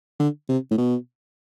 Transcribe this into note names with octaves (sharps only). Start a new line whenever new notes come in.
D3
C3
A2
B2